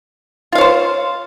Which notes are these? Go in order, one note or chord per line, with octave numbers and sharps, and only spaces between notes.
F4 C5 C#5 F5